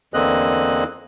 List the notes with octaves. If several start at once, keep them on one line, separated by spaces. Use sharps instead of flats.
E2 D3 A#3 C4 D#5 F#6